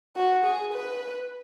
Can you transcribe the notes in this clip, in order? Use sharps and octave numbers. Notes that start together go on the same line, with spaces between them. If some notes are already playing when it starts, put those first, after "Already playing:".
F#4
G#4
B4